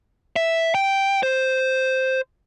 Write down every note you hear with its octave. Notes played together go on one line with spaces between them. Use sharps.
E5
G5
C5